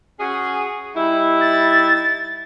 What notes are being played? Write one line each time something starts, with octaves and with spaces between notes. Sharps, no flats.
C#4 F#4 G#4
G3 D#4 E4
A6